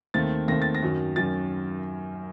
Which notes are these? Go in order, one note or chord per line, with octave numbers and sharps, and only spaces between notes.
D#2 D#3 A3 C4 A6
D#2 D#3 A3 C4 A#6
A6
A#6
F#2 D#3 F#3
F#2 D#3 F#3 A6